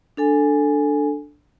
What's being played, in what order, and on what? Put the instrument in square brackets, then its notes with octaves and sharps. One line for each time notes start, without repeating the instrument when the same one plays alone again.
[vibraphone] D4 A4 G#5